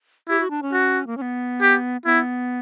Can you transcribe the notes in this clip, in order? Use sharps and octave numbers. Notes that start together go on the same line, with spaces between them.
E4 G4
F#4
D4
C#4
F#4
A#3
C#4
B3
G4
B3 E4